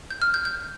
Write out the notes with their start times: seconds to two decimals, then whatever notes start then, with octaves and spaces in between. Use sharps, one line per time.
0.11 G6
0.22 F6
0.34 G6
0.45 G6